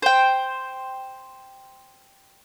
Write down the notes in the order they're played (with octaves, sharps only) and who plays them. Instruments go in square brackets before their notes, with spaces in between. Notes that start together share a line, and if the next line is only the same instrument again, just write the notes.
[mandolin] C5 G5